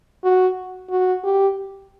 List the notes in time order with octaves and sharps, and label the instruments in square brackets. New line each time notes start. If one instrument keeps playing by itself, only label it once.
[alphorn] F#4
F#4
G4